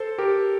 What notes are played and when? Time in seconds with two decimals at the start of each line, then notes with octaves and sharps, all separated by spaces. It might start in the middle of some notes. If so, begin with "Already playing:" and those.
Already playing: A4 C5
0.18 G4 A#4